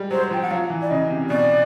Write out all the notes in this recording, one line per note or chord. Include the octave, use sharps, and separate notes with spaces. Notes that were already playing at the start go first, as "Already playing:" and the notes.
Already playing: G3 G#3
F#3 C5
F3 G5
F#5
F#3 F5
E3
D5
C#3 D#5
C3
B2 D5